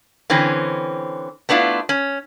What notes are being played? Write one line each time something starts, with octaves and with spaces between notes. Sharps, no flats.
D3 E3 C4 C#4
A3 B3 D4 E4 F4
C#4